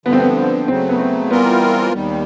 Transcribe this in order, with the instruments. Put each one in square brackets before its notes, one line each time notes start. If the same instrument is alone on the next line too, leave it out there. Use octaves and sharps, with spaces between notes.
[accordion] G2 D3 F3 [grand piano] B3
[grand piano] C4
B3
[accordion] C#3 F#3 A3 [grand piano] C4
[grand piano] B3
C4
[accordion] E3 G3 C4 F4 A#4 [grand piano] B3
[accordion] D#2 D#3 G3